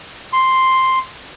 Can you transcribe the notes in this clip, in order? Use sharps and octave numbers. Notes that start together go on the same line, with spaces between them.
C6